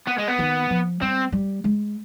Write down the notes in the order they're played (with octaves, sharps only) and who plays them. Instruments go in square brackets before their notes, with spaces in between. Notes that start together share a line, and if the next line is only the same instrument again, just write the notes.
[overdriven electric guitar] B3
G#3
B3
[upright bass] D#3
F3
[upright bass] G3 [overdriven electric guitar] C4
[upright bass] G3
G#3